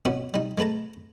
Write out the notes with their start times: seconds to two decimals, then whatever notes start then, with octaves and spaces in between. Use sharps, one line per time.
0.05 B2 B3 C#4 F#4
0.34 G3 D#4
0.58 G#3 A3 B4 A5 A#5